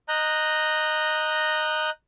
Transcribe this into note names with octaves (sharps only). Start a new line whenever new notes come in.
D#5 A#5 F#6 G6